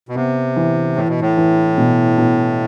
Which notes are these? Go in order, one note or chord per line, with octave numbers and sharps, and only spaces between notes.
B2
C3 B3
E3
A2 E3
B2
A2
E3
B2
B2